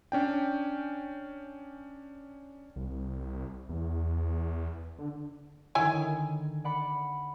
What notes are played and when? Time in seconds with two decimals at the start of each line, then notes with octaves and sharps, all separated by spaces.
0.12 C#4 D4 G5
2.76 C2
3.69 E2
4.99 D3
5.75 D3 D#3 E4 C#5 G#5
6.64 D5 F#5 B5